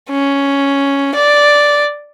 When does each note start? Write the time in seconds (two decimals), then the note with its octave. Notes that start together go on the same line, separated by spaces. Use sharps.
0.11 C#4
1.15 D5